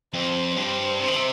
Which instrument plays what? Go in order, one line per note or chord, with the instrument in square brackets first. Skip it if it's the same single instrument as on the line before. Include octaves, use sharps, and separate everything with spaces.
[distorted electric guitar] F2 [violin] C5
[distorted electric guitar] G2 [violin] C5
[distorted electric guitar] C3
D#3
C3